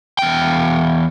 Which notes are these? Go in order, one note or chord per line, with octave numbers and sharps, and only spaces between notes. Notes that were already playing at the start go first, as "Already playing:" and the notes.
E2 G5